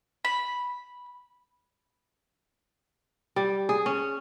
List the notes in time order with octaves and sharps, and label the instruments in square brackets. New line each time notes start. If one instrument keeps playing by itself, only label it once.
[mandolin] B5
[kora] G3
G#4
C#4